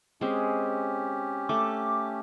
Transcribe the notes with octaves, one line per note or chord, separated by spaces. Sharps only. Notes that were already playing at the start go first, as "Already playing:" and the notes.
G#3 C4 C#4 G4
A3 D6